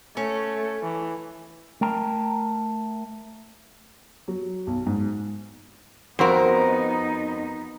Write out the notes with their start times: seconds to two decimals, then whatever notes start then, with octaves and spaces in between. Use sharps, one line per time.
0.17 A3 C#4
0.83 E3
1.81 A3 A#4 G5 A#5
4.28 F#3
4.67 B1
4.86 G#2
6.19 F2 B3 C4 D#4 F#4 A#4 C5